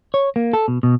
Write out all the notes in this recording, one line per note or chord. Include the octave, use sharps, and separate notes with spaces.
C#5
A#3
A4
B2
B2